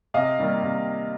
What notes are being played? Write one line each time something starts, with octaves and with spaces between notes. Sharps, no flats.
C3 D#5 F5
D#3 G3 A#3
C3